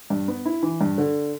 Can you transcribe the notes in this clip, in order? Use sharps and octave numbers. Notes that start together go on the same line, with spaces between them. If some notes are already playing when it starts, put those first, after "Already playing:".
G2
B3
E4
E3
G2
D3